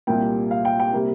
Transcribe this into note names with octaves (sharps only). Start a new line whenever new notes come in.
C2 A#2 G3 A#3 G5
F5
G5
G5
C3 G3 A#3